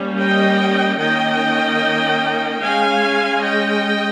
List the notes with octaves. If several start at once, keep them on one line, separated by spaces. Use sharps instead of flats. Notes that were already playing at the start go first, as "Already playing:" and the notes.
Already playing: G3 A#3 C#4
D#5 G5
D#3 A#3 C#4 D#5 G5
G#3 C#4 F5 G#5
D#5 G5